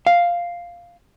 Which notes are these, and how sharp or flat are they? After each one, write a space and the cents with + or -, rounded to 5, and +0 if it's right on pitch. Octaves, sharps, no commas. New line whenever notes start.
F5 +0